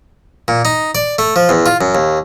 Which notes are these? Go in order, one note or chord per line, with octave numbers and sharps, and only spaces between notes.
A#2
D#4
D5
A3
F3
E2
F4
F#2
D#2